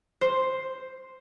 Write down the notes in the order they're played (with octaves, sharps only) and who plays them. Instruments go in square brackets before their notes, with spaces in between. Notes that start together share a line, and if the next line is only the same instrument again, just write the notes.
[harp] C5